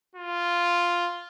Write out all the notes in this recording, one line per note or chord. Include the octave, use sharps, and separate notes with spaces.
F4